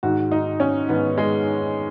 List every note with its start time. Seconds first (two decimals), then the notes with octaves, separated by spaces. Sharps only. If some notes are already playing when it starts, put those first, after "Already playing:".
0.03 G#2 D#3 F#4
0.32 D#4
0.60 C#4
0.89 G#2 D#3 B3
1.18 G#3